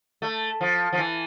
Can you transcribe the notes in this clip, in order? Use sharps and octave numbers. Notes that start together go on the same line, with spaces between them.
A3
F3
F3
E3